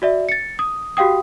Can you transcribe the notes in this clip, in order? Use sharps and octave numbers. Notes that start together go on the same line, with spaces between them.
F#4 D5 E5
A6 C#7
D#6
F#4 G4 F5 G5 D#6